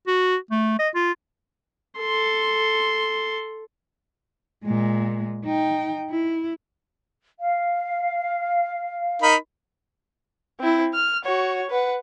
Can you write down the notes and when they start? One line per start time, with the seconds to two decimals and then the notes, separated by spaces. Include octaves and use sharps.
0.07 F#4
0.51 A3
0.79 D#5
0.95 F4
1.99 A4 C6
4.64 A#2 G#3
5.45 D#4 G5
6.10 E4
7.40 F5
9.22 D#4 A#4 B5
10.60 C4 E4
10.94 F6
11.25 F#4 C#5
11.71 B4 F#5